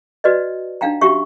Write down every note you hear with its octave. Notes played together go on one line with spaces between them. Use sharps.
F#4 B4 D5 D#5
D4 D#4 F5 G5 A#5
C#4 F#4 G4 E5 C#6